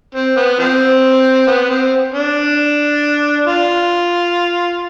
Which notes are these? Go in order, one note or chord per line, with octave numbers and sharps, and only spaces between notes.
C4
B3
F3 C4
B3
C4
D4
F4